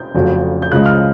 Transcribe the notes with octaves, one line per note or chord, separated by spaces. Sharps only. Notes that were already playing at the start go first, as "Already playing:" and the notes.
Already playing: G6
F1 F2 C#3 F#3
G6
C#2 C#3 F3 G#3 F#6
F6